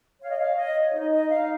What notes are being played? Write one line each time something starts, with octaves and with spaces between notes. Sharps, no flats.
C#5 F5
D#5
F5
C#5 D#5
C#5
D#4 D#5
D#5
D#4 F5